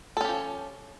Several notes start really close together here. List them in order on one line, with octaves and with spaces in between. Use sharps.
A4 C#4 G4 F3